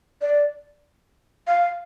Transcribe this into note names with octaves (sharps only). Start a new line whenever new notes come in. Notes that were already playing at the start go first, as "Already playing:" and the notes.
D5
F5